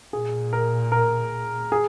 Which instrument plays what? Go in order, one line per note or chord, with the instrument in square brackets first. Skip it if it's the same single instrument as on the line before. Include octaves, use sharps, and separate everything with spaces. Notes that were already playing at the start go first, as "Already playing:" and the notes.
[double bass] A#2 [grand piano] G#4
[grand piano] A#4
A#4
G#4